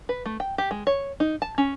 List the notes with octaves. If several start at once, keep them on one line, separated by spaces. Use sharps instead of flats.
B4
A3
G5
G4
G#3
C#5
D#4
A5
C#4